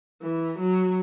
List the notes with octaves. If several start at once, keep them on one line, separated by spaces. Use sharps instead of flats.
E3
F#3